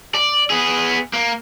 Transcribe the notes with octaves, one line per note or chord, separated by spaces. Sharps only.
D5
B3 G#4
A#3